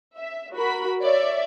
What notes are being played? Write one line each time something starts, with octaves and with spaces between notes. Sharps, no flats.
E5
F#4 A#4 B5
C#5 D5 E5